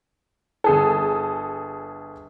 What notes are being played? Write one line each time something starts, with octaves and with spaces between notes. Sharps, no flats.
G1 G#4 A4